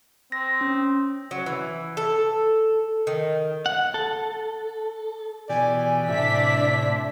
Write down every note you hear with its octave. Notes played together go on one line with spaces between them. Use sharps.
C4 A#6
C#4
F#3
E3
A4
D#3
F#5
A4
B2 E3 G4 D5 G#5
A2 C3 D4 E4 E5 B6